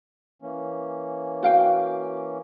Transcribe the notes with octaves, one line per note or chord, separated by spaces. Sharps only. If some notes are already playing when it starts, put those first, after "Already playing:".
E3 A#3 C#4
F#4 F5 G5